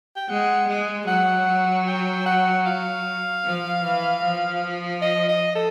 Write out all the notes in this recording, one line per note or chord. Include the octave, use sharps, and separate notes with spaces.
G5
G#3 F#5
G#3
F#3 F#5
G5
F#5
F5
F3
E3
F3
D#5
D#5
A4